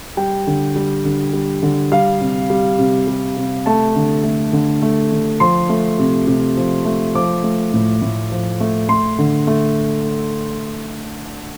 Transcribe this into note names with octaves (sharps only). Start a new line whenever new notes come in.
G3 G5
D3
G3
D3
G3
D3
G3 F5
C3
G3
C3
G3
C3
A3 A5
D3
A3
D3
A3
D3
F3 C6
A3
C3
C3
F3
A3
F3 D6
A3
A2
A2
F3
A3
A3 C6
D3
A3